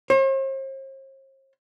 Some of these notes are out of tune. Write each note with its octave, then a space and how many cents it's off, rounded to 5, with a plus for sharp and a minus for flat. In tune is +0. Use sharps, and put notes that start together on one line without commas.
C5 +45